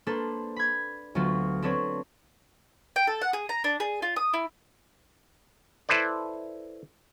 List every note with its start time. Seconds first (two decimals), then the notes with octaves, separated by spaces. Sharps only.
0.07 A#3 D4 A4 B4 C5
0.56 B5 G#6
1.15 D2 F#3 B3 F4
1.62 C4 D4 A4 B4 C#5
2.96 G5
3.07 A4
3.22 F#5
3.33 G#4
3.49 A#5
3.64 D4
3.80 G#4
4.02 F4
4.16 D#6
4.34 E4
5.89 E4 A4 B4 C5 D5